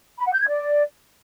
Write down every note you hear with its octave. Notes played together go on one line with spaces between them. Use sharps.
B5
F#5
G6
G#6
D5